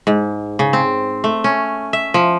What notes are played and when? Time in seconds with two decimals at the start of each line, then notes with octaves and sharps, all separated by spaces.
0.07 G#2
0.59 C#3
0.73 C4
1.24 A3
1.44 C#4
1.93 E5
2.14 F3